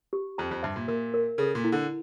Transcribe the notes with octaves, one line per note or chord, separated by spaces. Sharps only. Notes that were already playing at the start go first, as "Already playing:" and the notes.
G4
F2 A#5
F2
G2 E5
A#2
A#2 A#4
A#4
C#3 A4
A#2
E4
D3